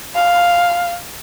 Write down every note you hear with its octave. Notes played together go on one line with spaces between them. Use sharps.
F5